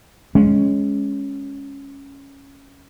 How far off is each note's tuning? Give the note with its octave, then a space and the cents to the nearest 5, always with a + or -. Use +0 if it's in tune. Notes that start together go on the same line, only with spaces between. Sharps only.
G#3 +0 C#4 +0